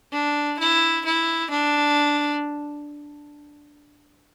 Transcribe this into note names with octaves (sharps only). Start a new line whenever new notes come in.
D4
E4
E4
D4